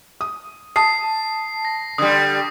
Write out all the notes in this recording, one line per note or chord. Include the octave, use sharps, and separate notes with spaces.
D#6
A5 D#6 C7
A#6
D3 G3 D#6